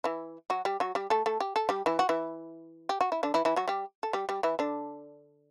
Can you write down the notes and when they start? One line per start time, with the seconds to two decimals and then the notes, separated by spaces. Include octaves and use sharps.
0.04 E3 E4
0.50 F#3 F#4
0.65 G3 G4
0.80 F#3 F#4
0.95 G3 G4
1.10 A3 A4
1.26 A3 A4
1.40 G4
1.56 A4
1.69 G3 G4
1.86 E3 E4
1.99 F#4
2.09 E3 E4
2.89 G4
3.01 F#4
3.12 E4
3.23 D3 D4
3.34 E3 E4
3.45 E3 E4
3.56 F#3 F#4
3.68 G3 G4
4.03 A4
4.13 G3 G4
4.29 G3 G4
4.43 E3 E4
4.59 D3 D4